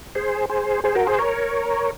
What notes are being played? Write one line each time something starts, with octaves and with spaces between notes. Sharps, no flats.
G#4 C5
G#4 C5
G#4 C5
F#4 A#4
G#4 C5
A#4 C#5